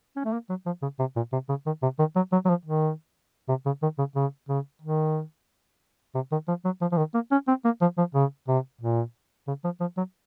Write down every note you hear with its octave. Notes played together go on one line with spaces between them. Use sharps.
C#4
A3
A#3
F#3
F3
C#3
C3
A#2
C3
C#3
D#3
C3
D#3
F#3
F#3
F#3
F3
D#3
C3
C#3
D#3
C#3
C#3
C#3
D#3
C3
D#3
F3
F#3
F3
F3
D#3
A#3
C#4
C4
A#3
F3
F3
C#3
C3
A#2
C#3
F3
F3
F#3